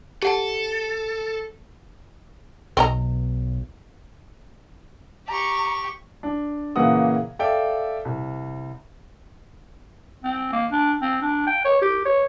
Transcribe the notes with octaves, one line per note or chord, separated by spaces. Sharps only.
G4 A4 F#5 A5
B1 C4 D#5 A#5
G4 A#5 C#6
D4
A#2 C#3 E3 A#3 F#5 D#6
A4 D5 E5 F5 G5
C2
C4
A#3
D4
C4
D4
G5
C#5
G4
C#5